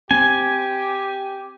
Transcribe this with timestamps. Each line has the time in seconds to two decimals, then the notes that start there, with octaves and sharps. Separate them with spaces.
0.11 C4 G4 G#5